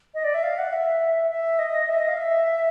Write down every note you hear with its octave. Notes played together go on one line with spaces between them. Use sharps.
D#5
D5
E5
F5
F#5
E5
E5
D#5
E5
D#5
F5
E5